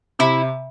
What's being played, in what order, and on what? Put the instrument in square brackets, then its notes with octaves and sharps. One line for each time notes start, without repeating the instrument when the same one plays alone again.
[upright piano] C3 [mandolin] E4